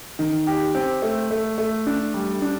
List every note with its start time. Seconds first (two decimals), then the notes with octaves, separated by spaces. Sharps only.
0.19 D#3
0.47 G4
0.75 C4
1.02 A3
1.31 A3
1.58 A3
1.87 D4
2.14 G3
2.42 D4